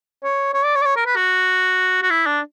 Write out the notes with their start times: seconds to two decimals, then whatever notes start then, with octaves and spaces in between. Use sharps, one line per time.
0.24 C#5
0.54 C#5
0.64 D5
0.75 C#5
0.81 D5
0.85 C#5
0.96 A#4
1.06 B4
1.16 F#4
2.02 F#4
2.10 E4
2.26 D4